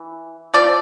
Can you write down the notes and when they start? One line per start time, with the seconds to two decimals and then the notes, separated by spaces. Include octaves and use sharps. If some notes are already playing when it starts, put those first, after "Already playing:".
Already playing: E3
0.54 F3 C4 F4 D5